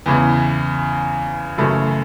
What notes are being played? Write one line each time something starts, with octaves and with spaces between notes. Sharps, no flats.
E2 C#3 E3
F#2 C#3 E3 A3